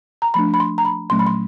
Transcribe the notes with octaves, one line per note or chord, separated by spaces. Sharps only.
A#5
F3 A3 D4 B5
B5
C6
A#5
B5
A#2 F#3 A3 C#4 C6
B5
C6